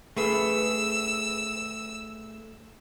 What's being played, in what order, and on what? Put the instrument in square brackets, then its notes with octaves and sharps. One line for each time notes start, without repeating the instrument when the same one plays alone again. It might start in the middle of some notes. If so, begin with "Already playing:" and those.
[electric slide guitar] A3 G#4 B4 [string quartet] E6